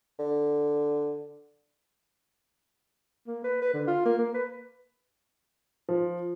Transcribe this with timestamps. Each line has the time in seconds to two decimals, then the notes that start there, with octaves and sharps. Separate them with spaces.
0.19 D3
3.27 A#3
3.44 B4
3.62 B4
3.74 D3
3.88 F4
4.05 A#3
4.19 A#3
4.34 B4
5.89 F3